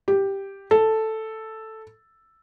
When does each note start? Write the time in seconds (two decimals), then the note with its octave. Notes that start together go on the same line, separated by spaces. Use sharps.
0.08 G4
0.71 A4